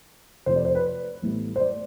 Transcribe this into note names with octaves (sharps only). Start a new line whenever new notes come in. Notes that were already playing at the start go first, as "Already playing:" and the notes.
F2 C3 F3 A3 C5
D5
C5
B4
A1 A2 G3 B3
C5
D5